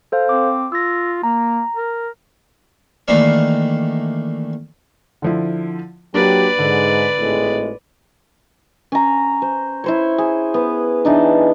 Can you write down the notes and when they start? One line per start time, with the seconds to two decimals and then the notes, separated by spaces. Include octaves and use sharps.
0.12 A4 C5 F5
0.29 C4 D6
0.72 F4 E6 A#6
1.23 A#3 A#5
1.76 A#4
3.08 D#3 E3 A3 A#3 D4 F5
5.22 D3 F3 E4
6.14 F#3 A#3 D4 G4 B4 D5
6.59 G#2 D3
7.19 G#1 A2 G#3
8.92 C#4 A#5
9.42 C5
9.84 E4 C5 C#5
10.18 G#4
10.54 B3
11.05 E3 D4 D#4